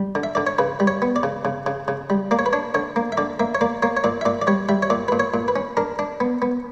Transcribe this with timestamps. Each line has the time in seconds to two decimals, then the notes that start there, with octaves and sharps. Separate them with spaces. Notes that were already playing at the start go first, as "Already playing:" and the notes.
Already playing: G3
0.15 D3
0.23 E5
0.35 D3 D5
0.47 C#5
0.58 C#3 B4
0.80 G3
0.87 C#5
1.02 B3
1.16 D5
1.23 C#3
1.45 C#3
1.66 C#3
1.88 C#3
2.10 G3
2.31 A#3 D5
2.39 C#5
2.46 B4
2.53 D4 C#5
2.74 D3 C#5
2.96 A#3
3.12 E5
3.17 D3 D5
3.40 A#3 E5
3.55 C#5
3.61 A#3 D5
3.82 A#3 C#5
3.97 C#5
4.04 A#2 D5
4.21 E5
4.25 A#2 D5
4.42 D5
4.47 G3 C#5
4.69 G3 E5
4.83 C#5
4.90 A#2 D5
5.08 A#2 B4
5.20 C#5
5.34 A#2
5.48 B4
5.56 C#4
5.77 D4 A#4
5.99 D4
6.20 B3
6.42 B3